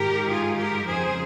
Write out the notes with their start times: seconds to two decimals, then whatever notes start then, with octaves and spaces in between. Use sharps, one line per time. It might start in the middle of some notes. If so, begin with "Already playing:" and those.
Already playing: G#2 D#3 G4 A#4
0.28 F4 G#4
0.58 G4 A#4
0.87 F2 C#3 F3 G#4 C5